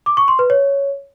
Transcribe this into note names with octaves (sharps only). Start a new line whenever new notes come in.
D6
C#6
C6
B4
C#5